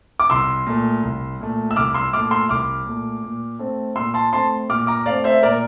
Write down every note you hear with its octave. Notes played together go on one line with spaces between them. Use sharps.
D6
C2 C6 E6
A#2 A3
C2
A#2 A3
E6
C2 D6 F6
C6 E6
A#2 A3 D6 F6
C6 E6
C2 D6 F6
A#2 A3
A#2
A3 C4
A#2 C6 E6
A5 C6
A3 C4 A5 C6
A#2 D6 F6
A#5 D6
A3 C4 D5 F5
C5 E5
A#2 A#4 D5